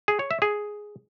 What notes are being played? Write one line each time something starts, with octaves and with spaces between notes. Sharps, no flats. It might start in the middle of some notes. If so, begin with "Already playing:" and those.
G#4
C#5
E5
G#4